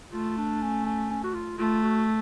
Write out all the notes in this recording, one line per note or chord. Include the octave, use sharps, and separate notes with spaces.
A3 F4
D4
C#4
C#4
C#4
F#4
F4
A3 F4
F#4